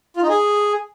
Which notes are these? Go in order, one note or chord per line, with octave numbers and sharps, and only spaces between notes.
F4
D#4
G#4